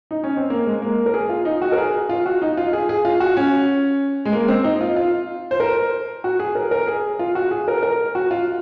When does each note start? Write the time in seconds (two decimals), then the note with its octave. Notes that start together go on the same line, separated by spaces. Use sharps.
0.11 D#4
0.24 C#4
0.37 C4
0.50 A#3
0.66 G#3
0.82 A#3
1.06 A#4
1.14 G#4
1.29 F4
1.45 D#4
1.62 F#4
1.72 A#4
1.78 G#4
2.09 F4
2.26 F#4
2.42 D#4
2.57 F4
2.73 G#4
2.89 G#4
3.05 F4
3.20 F#4
3.37 C#4
4.25 G#3
4.33 A#3
4.48 C4
4.64 D#4
4.81 F4
4.96 F4
5.51 C5
5.60 A#4
6.24 F#4
6.40 G#4
6.55 A#4
6.71 A#4
6.87 G#4
7.19 F4
7.35 F#4
7.51 G#4
7.68 A#4
7.83 A#4
8.15 F#4
8.31 F4